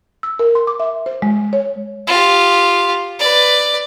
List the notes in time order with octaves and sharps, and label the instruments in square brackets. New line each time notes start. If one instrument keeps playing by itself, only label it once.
[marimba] E6
A#4
C6
D6
E5
C5
G#3
C#5
[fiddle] F4 G4
B4 D5